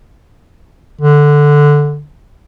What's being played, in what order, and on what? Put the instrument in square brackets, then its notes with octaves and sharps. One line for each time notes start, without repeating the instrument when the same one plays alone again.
[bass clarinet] D3